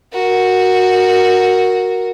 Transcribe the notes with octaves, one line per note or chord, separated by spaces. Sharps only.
F#4 A#4